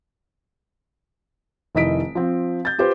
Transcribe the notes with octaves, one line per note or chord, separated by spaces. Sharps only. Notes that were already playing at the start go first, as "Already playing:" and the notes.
F1 D#3 E4 D#5 B6 D7
F3 C4
G6 A6
F4 G4 B4 C5